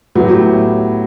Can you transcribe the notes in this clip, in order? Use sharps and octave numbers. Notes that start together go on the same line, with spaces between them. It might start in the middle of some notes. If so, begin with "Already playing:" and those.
A2 F#3 B3 E4 G4